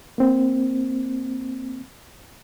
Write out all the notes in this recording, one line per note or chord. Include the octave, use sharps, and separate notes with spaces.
A#3 C4